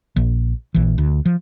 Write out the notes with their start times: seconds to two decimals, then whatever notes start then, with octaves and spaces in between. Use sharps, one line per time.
0.16 A#1
0.74 A#1 E3
0.98 D2
1.25 F3